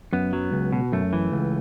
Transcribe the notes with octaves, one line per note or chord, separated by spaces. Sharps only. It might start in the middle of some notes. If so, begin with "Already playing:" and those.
F#2 B3
F#3
C#2
B2
F#2 A3
E3
C#2